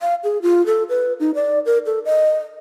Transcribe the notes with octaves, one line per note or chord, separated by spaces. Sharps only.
F5
G#4
F4
A4
B4
D#4
D5
A#4
A4
D#5